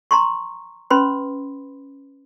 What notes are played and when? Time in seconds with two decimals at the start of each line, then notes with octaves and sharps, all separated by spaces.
0.11 A#5 C6 C#6
0.90 C#4 B4 B5 C6